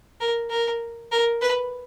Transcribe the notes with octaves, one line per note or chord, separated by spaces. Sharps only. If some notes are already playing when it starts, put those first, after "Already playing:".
A#4
A#4
A#4
B4